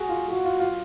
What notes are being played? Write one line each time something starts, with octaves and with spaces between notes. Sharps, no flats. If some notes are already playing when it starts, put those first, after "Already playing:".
Already playing: F#4 G#4
F4
F4 F#4
F4
F4